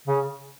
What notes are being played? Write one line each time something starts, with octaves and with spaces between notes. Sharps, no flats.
C#3